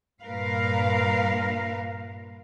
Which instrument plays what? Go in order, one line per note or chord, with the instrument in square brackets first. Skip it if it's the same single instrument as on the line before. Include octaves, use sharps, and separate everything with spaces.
[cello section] G2 A#2 A#4 B4 F5